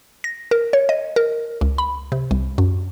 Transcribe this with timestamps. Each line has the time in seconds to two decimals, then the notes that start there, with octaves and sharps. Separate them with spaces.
0.24 A#6
0.51 A#4
0.73 C#5
0.89 D#5
1.16 A#4
1.61 C#2
1.78 B5
2.12 C3
2.31 C2
2.58 F#2